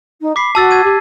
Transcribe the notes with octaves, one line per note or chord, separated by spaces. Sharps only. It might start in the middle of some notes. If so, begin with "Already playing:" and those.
D#4
B5 D6 B6 C7
F#4 A5 E6 A6
G#6 D#7
G4